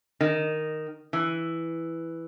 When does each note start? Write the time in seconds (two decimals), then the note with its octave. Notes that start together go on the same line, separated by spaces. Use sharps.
0.21 D#3
1.13 E3